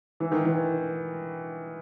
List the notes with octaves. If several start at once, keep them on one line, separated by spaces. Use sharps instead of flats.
E3
D#3
E3